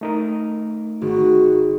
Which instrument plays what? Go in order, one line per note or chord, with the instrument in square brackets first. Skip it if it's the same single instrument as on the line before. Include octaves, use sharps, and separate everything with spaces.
[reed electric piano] A3 D#4 A#4
[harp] G#1 [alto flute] F#4